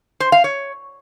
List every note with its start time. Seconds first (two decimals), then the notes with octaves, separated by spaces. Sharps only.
0.20 C5
0.32 F5
0.44 C#5